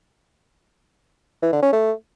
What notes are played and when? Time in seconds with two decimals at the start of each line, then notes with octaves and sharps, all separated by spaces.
1.43 E3
1.53 D3
1.63 C#4
1.73 A3